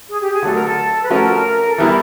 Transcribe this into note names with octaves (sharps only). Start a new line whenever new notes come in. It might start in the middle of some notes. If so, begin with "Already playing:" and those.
G#4
G4
G#4
D3 F#3 A3 A4
A#4
A4
B4
F3 A3 C#4 F#4 A#4
A4
E3 G3 B3 E4 A#4